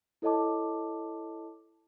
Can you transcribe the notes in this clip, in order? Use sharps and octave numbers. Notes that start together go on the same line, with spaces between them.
E4 A4 C#5 D#5 A5 D6